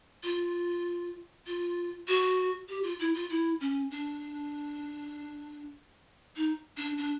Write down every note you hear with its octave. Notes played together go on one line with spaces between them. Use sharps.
F4
F4
F#4
G4
F4
E4
F4
E4
C#4
D4
D#4
D4
D4